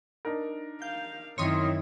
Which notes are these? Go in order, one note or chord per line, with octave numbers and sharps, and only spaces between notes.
D4 D#4 A#4
F5 G6
F#2 D#3 C4 E4 C#5 C6 D#6